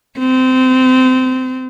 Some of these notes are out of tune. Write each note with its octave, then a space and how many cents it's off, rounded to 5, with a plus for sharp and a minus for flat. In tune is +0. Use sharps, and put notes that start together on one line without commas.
C4 -25